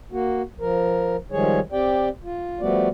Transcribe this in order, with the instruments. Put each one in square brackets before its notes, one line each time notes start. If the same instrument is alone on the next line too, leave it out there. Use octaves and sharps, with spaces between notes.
[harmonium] A#3 F#4
F3 A#4
D#3 F3 G3 G#3 G#4 C#5
C4 G4 D5 G5
F4
F3 G3 A3 B3 F#4 D5